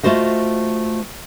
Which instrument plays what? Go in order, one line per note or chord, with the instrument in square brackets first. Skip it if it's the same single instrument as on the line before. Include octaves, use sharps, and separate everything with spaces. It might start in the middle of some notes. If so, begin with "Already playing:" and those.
[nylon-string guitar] A3 F4 F#4 C5 D#5